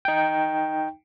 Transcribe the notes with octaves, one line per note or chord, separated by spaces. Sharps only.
D#4 G5